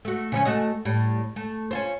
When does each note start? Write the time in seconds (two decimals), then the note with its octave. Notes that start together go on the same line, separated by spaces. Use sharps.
0.05 A3 F#4
0.32 C#3 F3 C#4
0.45 A3 F#4 D#5
0.85 A2 G3
1.36 A3
1.71 C#4 F4 C5